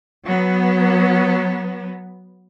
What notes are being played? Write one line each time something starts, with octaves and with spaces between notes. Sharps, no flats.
F#3 B3